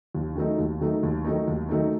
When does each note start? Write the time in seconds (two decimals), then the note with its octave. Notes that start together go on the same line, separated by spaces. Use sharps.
0.15 D#2
0.36 D#3 F#3 A3 D#4
0.58 D#2
0.81 D#3 F#3 A3 D#4
1.03 D#2
1.25 D#3 F#3 A3 D#4
1.48 D#2
1.69 D#3 F#3 A3 D#4